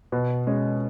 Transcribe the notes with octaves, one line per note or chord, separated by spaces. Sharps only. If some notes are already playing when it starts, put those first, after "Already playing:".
B2
G#3 C#4